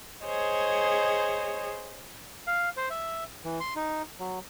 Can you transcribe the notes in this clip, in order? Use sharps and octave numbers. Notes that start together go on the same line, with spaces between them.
G#4 C5 C#5 D#5
F5
C5
E5
E3
C6
D#4
F#3